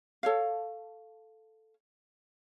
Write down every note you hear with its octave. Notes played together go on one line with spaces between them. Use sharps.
A4 C#5 F5